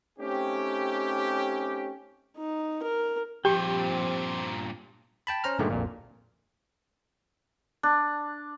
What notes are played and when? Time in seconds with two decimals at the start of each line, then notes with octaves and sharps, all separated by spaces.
0.19 A3 C4 C#4 D#4 G4
2.37 D#4
2.82 A#4
3.45 G2 A#2 F3 C4 G4 G5
5.27 G5 A5 B5
5.44 C#4 C5 A#5 F6
5.59 G2 A#2 D3 D#3 G#3 A3
5.71 A#1 F2 A#2
7.83 D4